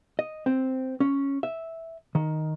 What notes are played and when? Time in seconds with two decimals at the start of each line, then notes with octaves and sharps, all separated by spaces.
0.19 D#5
0.46 C4
1.00 C#4
1.43 E5
2.15 D#3